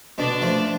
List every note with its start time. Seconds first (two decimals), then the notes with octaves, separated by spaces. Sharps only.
0.18 B2 D3 D4
0.41 F3 A3